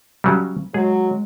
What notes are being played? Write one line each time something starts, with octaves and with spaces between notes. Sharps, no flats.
C#3 F#3 G3
F#3 G#3 G#4